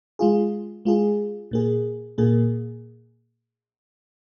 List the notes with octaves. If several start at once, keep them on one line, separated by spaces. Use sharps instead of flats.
G#3 F4 G#4
G#3 F4 G#4
A#2 A#3 G#4
A#2 A#3 G#4